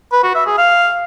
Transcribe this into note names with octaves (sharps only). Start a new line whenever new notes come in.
B4
F#4
E5
G#4
F5